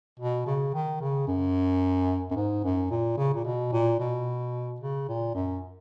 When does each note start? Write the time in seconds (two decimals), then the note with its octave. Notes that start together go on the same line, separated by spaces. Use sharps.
0.19 B2
0.46 C#3
0.74 D#3
1.01 C#3
1.27 F#2
2.31 F#2
2.36 G#2
2.64 F#2
2.90 A#2
3.17 C#3
3.34 A#2
3.44 B2
3.72 A#2
3.99 B2
4.81 C#3
5.08 A#2
5.34 F#2